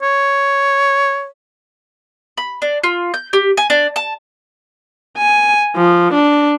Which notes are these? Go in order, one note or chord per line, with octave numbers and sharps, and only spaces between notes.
C#5
B5
D4
F4
G6
G4
G#5
D4
A5
G#5
F3
D4